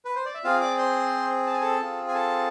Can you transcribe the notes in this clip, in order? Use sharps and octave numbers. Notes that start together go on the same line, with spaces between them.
B4
C5
D5
E5
C4 F4 G#4 F5
D5 D6
C5 C6
A5
G#5
A4 A5
C4 F4 G#4
G#5
A4 A5